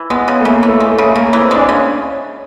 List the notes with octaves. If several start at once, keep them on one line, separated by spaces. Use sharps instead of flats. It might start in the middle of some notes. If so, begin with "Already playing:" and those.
Already playing: E3
G#3 B3
C#3
A3
C#3 A#3
E3
A3
G#3
A3
C#3
A3
C#3 A#3
E3
C4
G#3 D4
C#4
C#3